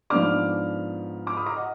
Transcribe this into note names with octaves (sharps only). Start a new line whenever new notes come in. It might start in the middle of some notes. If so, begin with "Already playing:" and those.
G#2 F3 B3 D4 D6 F6
D6 F6
B5 D#6
A#5 D6
D#5 F#5